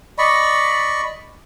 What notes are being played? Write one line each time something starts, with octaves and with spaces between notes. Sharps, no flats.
D5 D#5 B5 C#6